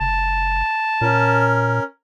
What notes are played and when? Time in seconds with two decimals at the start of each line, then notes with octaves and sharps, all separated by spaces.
0.01 F#1 A5
1.01 A#2 C#4 A#4